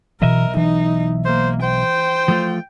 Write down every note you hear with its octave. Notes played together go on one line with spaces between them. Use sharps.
B1 B2 E3 A#4 D#5 E5
E3 D#4
A#3 C5
C5 G5
F3 A3 F4